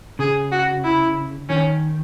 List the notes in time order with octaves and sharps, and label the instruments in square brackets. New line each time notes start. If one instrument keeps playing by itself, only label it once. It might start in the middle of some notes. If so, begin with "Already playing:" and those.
[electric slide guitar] C#3 [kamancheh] G#4
[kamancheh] F#4
E4
[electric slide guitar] D#3 [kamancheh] C#4